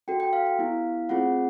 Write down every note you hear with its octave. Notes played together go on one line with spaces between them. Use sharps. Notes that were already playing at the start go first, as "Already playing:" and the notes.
C#4 F#4 A4 G5
G5
F5
F5
B3 E4 G4
A3 C4 F4 G#4 F#5